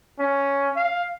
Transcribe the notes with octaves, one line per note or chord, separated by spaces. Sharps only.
C#4
F5